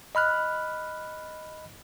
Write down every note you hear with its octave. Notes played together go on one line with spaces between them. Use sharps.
D#5 B5 F6 F#6